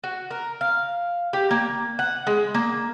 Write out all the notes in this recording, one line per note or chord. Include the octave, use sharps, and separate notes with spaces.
F#4
A#4
F5
G4
A#3
F#5
G#3
A#3